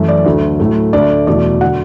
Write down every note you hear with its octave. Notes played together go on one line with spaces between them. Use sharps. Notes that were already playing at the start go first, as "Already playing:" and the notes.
Already playing: F#2 E3 A3
D5
D2 D3 F#3 A3
A2 F#3 A3
D2 D3 A3 D5
E2 B2 F#3 A3 D5
D3 F#3 F#5